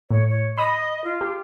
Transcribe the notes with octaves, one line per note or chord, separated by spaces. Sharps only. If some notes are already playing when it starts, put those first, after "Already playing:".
A2 C#5
C#5
D#5 B5 D#6
F4
G4